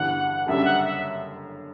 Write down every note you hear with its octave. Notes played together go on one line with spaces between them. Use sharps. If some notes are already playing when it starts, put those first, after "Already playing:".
Already playing: G1 G2 E3 F#5
F#1 F#2 D3 G3 E5
F#5
E5